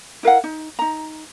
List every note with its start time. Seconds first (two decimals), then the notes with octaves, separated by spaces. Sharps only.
0.23 E4 A#4 F5 F#5
0.44 D#4
0.79 D#4 A#5